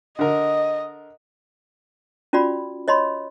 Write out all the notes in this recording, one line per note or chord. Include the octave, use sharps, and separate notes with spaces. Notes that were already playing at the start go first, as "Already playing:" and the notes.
D3 A#4 D#5
C#4 F4 F#4 D5 B5
C#5 D#5 B5 C6